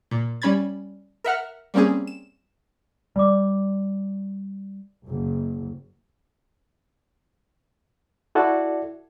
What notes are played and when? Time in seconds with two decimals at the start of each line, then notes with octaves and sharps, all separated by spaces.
0.11 A#2
0.42 G3 C#4 B5 G#6 A6
1.24 A#4 E5 F#5 F6
1.74 G3 A#3 C4 C#4 G#4
2.07 E7
3.16 G3 D5 D#5 D6
5.07 F#1
8.35 E4 F#4 A4 D5